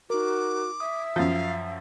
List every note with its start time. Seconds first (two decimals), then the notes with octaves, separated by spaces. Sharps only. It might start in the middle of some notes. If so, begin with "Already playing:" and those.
0.10 D#4 F#4 A#4 D6
0.80 E5 D#6
1.16 F#2 F3 F5